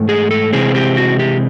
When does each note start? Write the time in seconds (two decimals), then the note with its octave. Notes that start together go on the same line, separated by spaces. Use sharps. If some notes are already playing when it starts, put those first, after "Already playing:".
Already playing: G#2 E3 A3
0.09 G#4
0.31 A4
0.53 C3 E3 G#3 C4 G#4
0.75 G4
0.97 F#4
1.19 G4